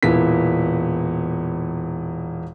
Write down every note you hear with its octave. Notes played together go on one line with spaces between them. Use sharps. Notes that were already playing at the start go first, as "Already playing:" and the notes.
E1 A#2 B3 E4 B6